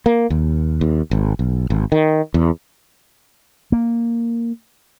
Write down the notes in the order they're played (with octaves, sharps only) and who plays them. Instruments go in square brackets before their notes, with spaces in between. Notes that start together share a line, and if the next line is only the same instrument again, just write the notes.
[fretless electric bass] A#3
D#2
D#2
G#1
B1
G#1
D#3
E2
[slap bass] A#3